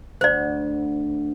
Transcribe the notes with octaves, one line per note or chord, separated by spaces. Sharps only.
D2 C5 D5